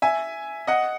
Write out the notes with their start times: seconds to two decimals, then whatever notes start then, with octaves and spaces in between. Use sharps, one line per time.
0.02 E5 G#5
0.67 D#5 F#5